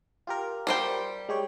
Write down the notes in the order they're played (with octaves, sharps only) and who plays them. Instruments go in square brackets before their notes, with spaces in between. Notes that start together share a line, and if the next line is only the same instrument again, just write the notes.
[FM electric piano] F4 G4 A#4
[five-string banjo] G3 C5 G5
[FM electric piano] G#3 G4 C#5